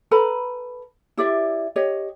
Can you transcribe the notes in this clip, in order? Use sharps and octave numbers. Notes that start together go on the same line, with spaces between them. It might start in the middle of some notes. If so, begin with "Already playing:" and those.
A4 B4 A#5 B5
E4 G4 D5 E5
G4 C#5 D#5